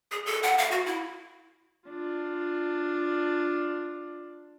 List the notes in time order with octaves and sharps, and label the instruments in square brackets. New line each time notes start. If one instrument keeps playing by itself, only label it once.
[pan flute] G#4
A4
F#5
F5
F#4
E4
[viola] D4 F4